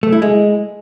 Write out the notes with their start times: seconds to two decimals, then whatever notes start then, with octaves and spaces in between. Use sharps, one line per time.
0.03 A3
0.12 E4
0.22 G#3